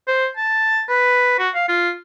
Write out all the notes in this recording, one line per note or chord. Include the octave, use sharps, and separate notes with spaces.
C5
A5
B4
F#4
F5
F4